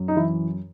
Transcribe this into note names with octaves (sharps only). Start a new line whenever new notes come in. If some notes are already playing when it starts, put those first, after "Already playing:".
Already playing: F#2
D#4
E3 E4